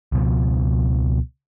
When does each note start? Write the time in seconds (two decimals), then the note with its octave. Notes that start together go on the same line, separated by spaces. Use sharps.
0.12 C#2 B2 F3